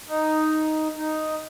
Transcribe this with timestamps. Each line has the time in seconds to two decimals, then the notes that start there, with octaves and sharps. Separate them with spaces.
0.08 D#4
0.96 D#4